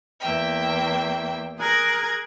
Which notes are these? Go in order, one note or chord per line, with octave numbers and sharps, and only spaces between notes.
E2 A#3 E5 G5
G#4 A#4 F#6 G#6 A#6